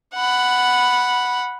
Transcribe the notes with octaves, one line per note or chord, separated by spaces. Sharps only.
F#5 B5